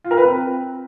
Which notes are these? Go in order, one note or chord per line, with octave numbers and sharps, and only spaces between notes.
F4
A#4
B4
C4